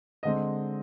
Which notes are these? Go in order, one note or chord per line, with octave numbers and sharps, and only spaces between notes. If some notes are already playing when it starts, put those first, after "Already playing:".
D3 G#3 C4 D#5